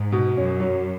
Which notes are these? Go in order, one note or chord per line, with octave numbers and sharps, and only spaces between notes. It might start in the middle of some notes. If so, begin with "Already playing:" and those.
Already playing: G#2
B2
F#2 C#4
F#3